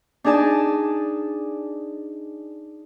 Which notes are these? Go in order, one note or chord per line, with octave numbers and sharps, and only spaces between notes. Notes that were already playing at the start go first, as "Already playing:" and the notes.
D4 D#4 G#4 D5 A5